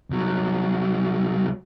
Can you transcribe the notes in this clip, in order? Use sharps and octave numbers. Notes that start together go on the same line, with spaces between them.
C2 F#3